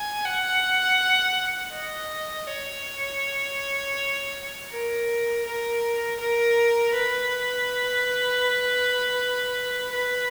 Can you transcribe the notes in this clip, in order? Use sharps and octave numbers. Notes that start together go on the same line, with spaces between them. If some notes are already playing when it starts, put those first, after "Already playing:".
Already playing: G#5
F#5
D#5
C#5
A#4
A#4
A#4
B4
B4